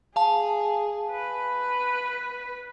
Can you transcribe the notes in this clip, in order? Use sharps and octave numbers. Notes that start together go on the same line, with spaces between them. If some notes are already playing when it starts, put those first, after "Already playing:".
G#4 F5 A5
B4